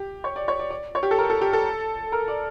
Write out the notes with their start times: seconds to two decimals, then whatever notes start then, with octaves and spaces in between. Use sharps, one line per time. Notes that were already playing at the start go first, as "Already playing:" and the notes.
Already playing: G4
0.24 C#5
0.36 D5
0.48 C#5
0.59 D5
0.70 D5
0.95 C#5
1.03 G4
1.11 A4
1.18 A#4
1.30 A4
1.41 G4
1.53 A4
2.12 A#4
2.28 D5